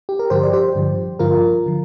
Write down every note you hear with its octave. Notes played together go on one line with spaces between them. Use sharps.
G4
A#4
G2 D3 F3 G4 C5
D5
G4 C5
G2 D3 F3
G2 D3 F3 F4 A#4
D3 F3